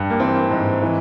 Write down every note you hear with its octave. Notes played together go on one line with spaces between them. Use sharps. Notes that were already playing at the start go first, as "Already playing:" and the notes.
Already playing: G2
A#3
E3 C4
G#2
E3